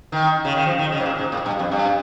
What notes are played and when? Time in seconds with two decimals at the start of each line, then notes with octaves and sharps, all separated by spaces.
0.12 D#3
0.45 C#3
0.55 D#3
0.66 F3
0.79 D#3
0.92 C#3
1.00 G#2
1.06 A#2
1.19 G#2
1.32 A#2
1.46 G2
1.59 F2
1.71 G2